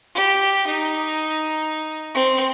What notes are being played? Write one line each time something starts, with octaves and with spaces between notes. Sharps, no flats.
G4
D#4
C4